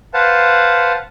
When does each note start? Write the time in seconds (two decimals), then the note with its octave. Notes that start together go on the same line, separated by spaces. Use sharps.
0.14 B4 C5 F5 F#5 A5